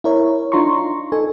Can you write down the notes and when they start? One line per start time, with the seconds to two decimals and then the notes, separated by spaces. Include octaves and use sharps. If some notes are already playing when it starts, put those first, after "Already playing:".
0.04 E4 A#4 C#5
0.52 D4 D#4 F4 A#5 C6 C#6
1.12 D#4 A4 G#5